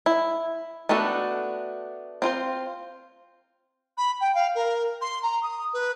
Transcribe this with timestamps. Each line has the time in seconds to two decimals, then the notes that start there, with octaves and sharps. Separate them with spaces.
0.06 E4
0.89 A3 B3 D4 F#4 A4
2.22 C4 F4 C5
3.97 B5
4.21 G5
4.35 F5
4.55 A#4
5.01 C6
5.23 A#5
5.43 D#6
5.73 B4